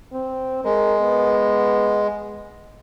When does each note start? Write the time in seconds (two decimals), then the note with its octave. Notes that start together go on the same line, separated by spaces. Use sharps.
0.13 C4
0.64 G#3 A#4
1.01 B3